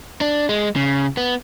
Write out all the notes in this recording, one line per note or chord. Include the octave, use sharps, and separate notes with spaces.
D4
G#3
C#3
B3